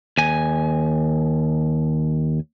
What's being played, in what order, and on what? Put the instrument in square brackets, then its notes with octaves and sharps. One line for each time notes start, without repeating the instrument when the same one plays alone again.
[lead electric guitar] D#2 G#5